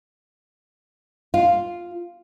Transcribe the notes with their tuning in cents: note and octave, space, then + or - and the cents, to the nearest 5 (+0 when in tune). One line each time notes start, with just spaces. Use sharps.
F4 +0 F5 +0